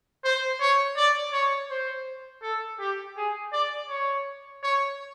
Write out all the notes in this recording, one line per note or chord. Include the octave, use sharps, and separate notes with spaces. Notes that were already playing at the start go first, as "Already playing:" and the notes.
C5
C#5
D5
C#5
C5
A4
G4
G#4
D5
C#5
C#5